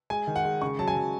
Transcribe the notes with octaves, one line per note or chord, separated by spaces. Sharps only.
G#3 G#5
D#3
F#5
G#3
C#3 C#6
F#3 A5
G#5
F#3